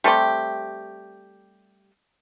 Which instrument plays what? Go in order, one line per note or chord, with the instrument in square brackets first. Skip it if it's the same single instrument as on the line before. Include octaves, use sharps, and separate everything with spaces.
[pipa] G3 A3 C4 G4